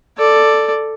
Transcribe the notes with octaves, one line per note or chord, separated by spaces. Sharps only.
A4 D5